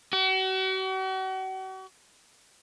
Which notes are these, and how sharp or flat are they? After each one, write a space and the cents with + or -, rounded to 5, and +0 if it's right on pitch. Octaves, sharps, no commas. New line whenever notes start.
F#4 +40